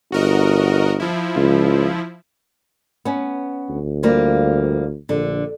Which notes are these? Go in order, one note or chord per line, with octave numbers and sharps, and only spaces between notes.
G1 F#4 A#4 D#5
F3 E4
C#2
B3 C#4
D2
F3 G3 A#3
A#1 D3